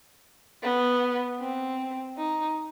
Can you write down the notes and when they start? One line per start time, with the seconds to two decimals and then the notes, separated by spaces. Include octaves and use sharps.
0.63 B3
1.40 C4
2.18 D#4